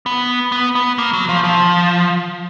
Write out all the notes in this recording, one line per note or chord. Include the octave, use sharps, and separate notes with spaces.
B3
B3
B3
A#3
F#3
F3
F3